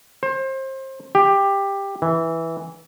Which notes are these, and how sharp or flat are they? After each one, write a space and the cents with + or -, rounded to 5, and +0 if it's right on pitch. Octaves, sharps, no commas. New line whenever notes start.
C5 +30
G4 +10
E3 -10